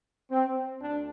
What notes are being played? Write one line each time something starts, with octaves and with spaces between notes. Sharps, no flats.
C4
D2 D4